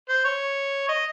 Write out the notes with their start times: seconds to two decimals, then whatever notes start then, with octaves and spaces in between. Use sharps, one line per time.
0.09 C5
0.25 C#5
0.88 D#5